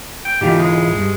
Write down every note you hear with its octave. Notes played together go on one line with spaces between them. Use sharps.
G5
G#2 E3 F4 G4
G#3
G2